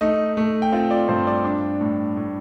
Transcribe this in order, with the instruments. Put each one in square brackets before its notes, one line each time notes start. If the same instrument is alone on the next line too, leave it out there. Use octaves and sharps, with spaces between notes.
[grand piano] A3 D#4 D#5
A3
G5
C4 F4 F5
D5
G2 C5
D5
D4
A2
A2